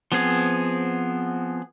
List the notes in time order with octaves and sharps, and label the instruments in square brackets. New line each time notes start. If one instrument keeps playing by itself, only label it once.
[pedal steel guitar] F3 B3 C4 G#4